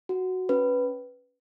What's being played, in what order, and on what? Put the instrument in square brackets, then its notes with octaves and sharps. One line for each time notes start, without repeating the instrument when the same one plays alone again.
[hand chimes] F#4
C#4 B4